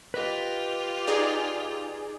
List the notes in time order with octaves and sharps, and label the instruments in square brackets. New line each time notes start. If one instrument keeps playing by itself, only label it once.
[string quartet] F4 G4 [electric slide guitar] B4 D#5
[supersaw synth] D#4 G#4 D5